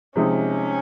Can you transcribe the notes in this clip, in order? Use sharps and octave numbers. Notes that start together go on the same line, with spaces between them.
C3 F3 G#3 C#4 D#4